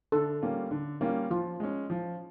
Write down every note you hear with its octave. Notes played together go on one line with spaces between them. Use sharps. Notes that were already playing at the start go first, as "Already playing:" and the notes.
D3 A4
G3 A#3 C#4 F4
D3
G3 A#3 C#4 F4
F3 F4
G#3 C#4
F3